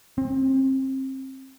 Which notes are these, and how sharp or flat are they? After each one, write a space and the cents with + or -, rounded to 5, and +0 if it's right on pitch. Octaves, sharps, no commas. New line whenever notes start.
C4 +30